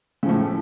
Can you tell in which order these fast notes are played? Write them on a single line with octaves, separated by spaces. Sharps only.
C#3 F3 A2